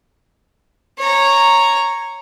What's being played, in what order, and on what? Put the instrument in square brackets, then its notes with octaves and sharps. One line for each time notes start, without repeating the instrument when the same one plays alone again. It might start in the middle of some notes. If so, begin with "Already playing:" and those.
[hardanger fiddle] C#5 A#5